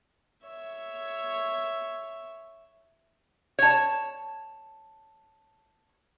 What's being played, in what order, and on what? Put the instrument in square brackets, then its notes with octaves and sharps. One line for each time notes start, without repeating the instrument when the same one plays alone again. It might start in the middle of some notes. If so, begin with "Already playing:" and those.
[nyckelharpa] C#5 E5
[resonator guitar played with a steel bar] C#5 A5